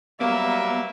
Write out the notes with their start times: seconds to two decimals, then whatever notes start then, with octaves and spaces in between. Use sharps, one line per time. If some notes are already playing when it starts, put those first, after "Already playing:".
0.21 F#3 G3 A#3 B3 E5